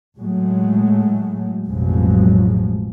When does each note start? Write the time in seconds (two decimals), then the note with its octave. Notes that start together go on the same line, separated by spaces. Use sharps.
0.17 A2 F#3 G#3 A3
1.65 A1 F2 B2 F3 F#3 G#3